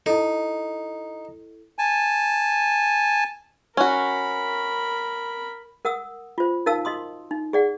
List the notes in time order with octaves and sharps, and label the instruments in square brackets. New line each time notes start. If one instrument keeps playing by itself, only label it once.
[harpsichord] D#4 [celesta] E4 A4
[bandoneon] G#5 A5
[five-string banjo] C#4 F#4 [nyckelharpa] A#4 B5
[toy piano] A#4 F#5 D#6 E6
F4 C5
D#4 A#4 F5 A5 E6
F#4 D#5 C6 D#6
D#4
G#4 D5 F#5